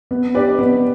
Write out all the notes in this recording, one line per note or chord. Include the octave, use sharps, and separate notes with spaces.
B3
D4 G4 B4 D5
B3